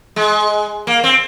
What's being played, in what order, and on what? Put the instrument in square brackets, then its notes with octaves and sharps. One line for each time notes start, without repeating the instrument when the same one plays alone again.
[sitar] G#3
A#3
C4